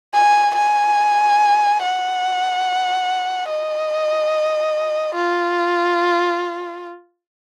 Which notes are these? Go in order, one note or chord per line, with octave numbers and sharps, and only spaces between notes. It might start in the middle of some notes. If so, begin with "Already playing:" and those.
G#5
G#5
F#5
D#5
F4